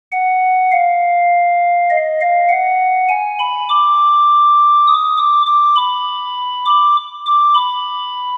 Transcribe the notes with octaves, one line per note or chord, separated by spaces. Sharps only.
F#5
F5
D#5
F5
F#5
G#5
B5
D6
D#6
D6
D6
B5
D6
D6
B5